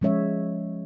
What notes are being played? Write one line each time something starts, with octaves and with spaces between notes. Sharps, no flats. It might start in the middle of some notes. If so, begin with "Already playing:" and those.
F3 G#3 C#4 C#5 E5